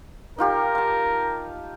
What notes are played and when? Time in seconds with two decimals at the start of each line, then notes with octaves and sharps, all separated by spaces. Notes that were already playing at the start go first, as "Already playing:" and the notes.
0.38 D#4 F4 G4 A#4
0.75 F5 A5